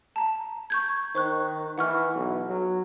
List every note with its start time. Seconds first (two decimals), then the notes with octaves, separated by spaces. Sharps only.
0.16 A5 A#5
0.70 C#6 G6 G#6
1.15 D#3 C5 C#6 F#6
1.78 E3 F#5 C#6 F6
2.16 B1
2.50 F#3